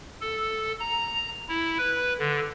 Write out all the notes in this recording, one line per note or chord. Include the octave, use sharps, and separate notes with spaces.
A4
A#5
E4
B4
D3